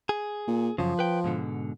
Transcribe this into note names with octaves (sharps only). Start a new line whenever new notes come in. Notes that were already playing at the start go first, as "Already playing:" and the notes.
G#4
A#2
F#2 C#3 F3
B4 G5
G#2 B2 D3